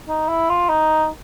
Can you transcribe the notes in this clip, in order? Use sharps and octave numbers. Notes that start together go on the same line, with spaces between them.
D#4
E4
F4
D#4